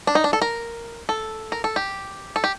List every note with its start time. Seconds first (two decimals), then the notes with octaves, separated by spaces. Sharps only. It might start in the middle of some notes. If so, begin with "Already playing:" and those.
0.07 D4
0.15 D#4
0.24 D4
0.33 A4
0.42 A#4
1.09 A4
1.52 A#4
1.64 A4
1.76 G4
2.36 A4
2.44 G4